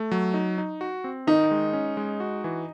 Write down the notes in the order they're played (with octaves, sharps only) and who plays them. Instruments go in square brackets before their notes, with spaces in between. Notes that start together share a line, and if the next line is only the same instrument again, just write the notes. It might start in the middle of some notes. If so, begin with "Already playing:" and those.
Already playing: [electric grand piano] A3
F#3
D#4
D#4
F#4
C4
[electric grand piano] D#3 [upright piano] D#4
[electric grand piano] G#3
C#4
G#3
F#4
E3